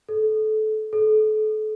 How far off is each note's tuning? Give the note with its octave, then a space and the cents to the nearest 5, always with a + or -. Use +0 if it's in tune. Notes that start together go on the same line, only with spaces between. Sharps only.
A4 -25
A4 -35